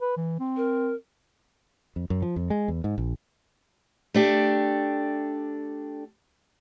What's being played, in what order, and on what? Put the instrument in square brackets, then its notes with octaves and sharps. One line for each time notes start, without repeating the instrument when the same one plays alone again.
[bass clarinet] B4
E3
C4
[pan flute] A#4
[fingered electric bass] F2
F#2
F3
F2
G#3
E2
G#2
A#1
[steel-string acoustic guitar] A3 D4 G4